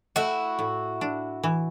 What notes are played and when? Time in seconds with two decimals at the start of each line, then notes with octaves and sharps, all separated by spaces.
0.16 A3 E4 F#4
0.59 A2
1.01 D4
1.43 E3